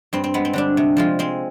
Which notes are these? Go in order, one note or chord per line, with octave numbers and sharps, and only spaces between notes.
G2 C4
C4
G#3 B3
C4
D3 G3 D4
C3
F3 G#3 F4
G#3 C4